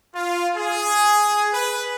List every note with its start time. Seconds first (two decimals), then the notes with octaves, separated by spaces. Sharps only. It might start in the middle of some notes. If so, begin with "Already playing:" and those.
0.15 F4
0.56 G#4
1.54 B4